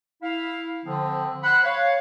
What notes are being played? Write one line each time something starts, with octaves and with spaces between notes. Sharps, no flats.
E4 F5
D3 F3 C4
C5 F#5 B5 F#6
C#5 F5